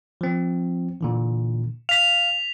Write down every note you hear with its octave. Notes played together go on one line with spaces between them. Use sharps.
F3 C4
A#2 D3 E3
F5 B6 F7